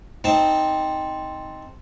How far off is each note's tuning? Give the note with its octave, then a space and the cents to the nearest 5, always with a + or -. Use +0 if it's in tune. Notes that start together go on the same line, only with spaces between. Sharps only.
C4 +0 D#4 +5 A5 +0